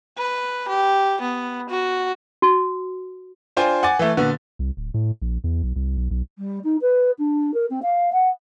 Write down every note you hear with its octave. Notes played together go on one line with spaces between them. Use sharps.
B4
G4
B3
F#4
F#4
D4 F4 C5 G5 G#5
F#5 G#5 D6 A6
E3 A3
A#2 D3 B3 F#4
C2
D1
A2
A#1
E2
B1
C2
B1
B1
G3
D#4
B4
D4
A#4
C4
F5
F#5